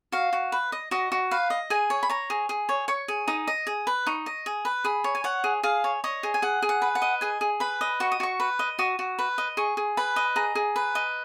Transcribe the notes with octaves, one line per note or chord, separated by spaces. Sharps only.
F#4 F5
F#4
B4
D#5
F#4 D#5
F#4
B4 F5
D#5
G#4 G#5
C#5
B5
C#5 A#5
G#4
G#4
C#5
C#5 C#6
G#4
D#4 D#6
D#5
G#4
B4
D#4 C#6
D#5
G#4
B4
G#4 B5
C#5
G#5
C#5 F#5
G#4
G#4 F5
C#5
C#5 D#5
G#4
G#5
G#4 F#5
G#4
F#5
B4
F#5
D#5
G#4 G#5
G#4
B4 B5
D#5
F#4 C#6
D#6
F#4 C#6
B4
D#5
F#4 D#6
F#4
B4
D#5
G#4 C#6
G#4
B4 B5
D#5
G#4 A#5
G#4
B4
D#5